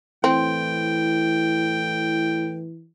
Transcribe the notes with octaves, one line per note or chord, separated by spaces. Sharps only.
A2 E3 C4 G5